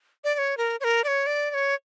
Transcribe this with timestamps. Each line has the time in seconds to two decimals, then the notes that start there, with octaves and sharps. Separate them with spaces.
0.24 D5
0.34 D5
0.38 C#5
0.57 A#4
0.80 C#5
0.84 A#4
1.04 D5
1.08 C#5
1.27 D5
1.50 D5
1.54 C#5